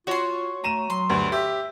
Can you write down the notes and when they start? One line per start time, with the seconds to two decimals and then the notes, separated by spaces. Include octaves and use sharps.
0.07 F4 F#4 C#5 C6 C#6
0.64 A3 A#5 D#7 E7
0.90 F#3 C6
1.09 D2 G2
1.32 G4 E5